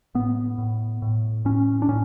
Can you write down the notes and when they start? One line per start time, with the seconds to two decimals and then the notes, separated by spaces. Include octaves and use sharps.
0.15 A2 B3
0.58 A2
1.02 A2
1.45 A2 C#4
1.82 D4
1.88 A2 C#4